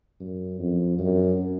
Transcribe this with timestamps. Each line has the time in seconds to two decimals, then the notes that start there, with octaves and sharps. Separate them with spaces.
0.20 F#2
0.59 F2
0.99 F#2